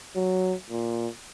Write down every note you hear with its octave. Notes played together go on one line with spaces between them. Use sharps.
F#3
A#2